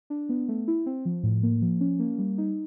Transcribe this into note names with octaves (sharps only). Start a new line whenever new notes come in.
D4
B3
A3
E4
C4
F3
A2
A#3
F3
C#4
A#3
G3
D#4